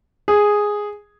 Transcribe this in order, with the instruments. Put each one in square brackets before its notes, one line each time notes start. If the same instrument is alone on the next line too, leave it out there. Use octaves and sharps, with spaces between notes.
[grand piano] G#4